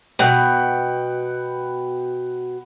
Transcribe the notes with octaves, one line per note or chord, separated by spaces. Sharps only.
B2 F#5 G5 B5